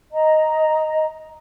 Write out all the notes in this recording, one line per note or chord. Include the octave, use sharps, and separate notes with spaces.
D#5 A#5